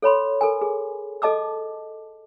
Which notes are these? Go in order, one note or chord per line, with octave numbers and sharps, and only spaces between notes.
A4 C#5 B5 C6
A4 A#4 G#5
G#4
A4 D#5 A5 D6 E6